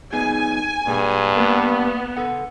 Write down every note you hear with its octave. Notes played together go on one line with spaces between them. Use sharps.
B3 D#4 G#4 G#5
G2 A#2 G#4 A5
A#3 B3 A#4
A4 F#5